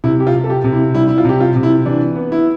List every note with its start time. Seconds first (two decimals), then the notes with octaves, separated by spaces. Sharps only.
0.04 C3 E4
0.20 G4
0.27 F4
0.34 C3
0.44 A4
0.50 G4
0.64 C3
0.72 E4
0.95 G3 E4
1.08 E4
1.18 F4
1.25 C3 G4
1.40 F4
1.56 C3
1.63 E4
1.86 E3 D4
2.16 B3
2.32 E4